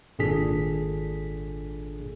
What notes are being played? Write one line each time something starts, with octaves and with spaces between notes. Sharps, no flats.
G#1 A#2 D4 G#4 A4 B6